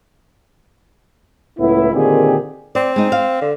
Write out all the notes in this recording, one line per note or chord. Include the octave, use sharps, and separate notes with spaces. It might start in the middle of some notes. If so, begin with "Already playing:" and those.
C#2 A2 B3 E4
A#2 D3 D#3 C4 G4 G#4
C4 D5
G#3 D#4
F5
D3